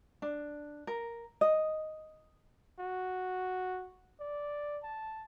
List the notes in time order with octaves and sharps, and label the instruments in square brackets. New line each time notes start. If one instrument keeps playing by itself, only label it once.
[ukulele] D4
A#4
D#5
[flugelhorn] F#4
D5
A5